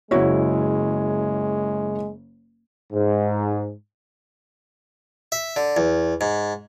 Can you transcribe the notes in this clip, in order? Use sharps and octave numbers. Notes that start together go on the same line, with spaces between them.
F#1 G#3 E4 F#4 C#5
G#2
E5
D3
E2
G#2